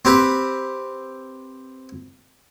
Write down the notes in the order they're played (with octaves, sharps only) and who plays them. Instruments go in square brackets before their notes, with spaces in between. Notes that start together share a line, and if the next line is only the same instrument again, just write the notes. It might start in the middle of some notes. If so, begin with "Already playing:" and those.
[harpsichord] C4 G4 B4